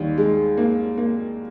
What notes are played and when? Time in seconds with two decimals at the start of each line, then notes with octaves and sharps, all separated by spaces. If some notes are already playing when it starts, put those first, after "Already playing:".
Already playing: D#2 D#3 G3
0.18 G#3
0.58 A#3
0.98 A#3